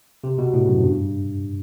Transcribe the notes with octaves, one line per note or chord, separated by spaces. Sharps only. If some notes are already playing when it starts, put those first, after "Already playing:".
C3
B2
A2
F#2
G2